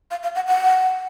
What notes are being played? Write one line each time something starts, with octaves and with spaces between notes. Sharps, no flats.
F5
F5
F#5
F#5